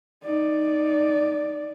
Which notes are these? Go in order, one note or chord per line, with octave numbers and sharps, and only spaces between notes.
D#4 D5